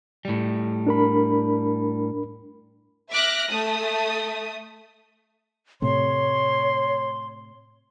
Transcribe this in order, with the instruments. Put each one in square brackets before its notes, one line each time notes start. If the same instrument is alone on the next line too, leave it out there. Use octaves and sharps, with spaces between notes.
[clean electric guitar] A2 G3
[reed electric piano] D4 A#4 B5
[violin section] E5 D6 F6 F#6 A#6
A3 D#6
[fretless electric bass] A2 C3 A3 [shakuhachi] C#5 [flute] C6